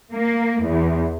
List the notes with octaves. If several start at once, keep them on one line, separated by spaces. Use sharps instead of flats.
A#3
E2